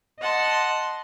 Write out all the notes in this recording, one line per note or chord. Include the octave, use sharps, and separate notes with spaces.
D#5 F#5 A5 C6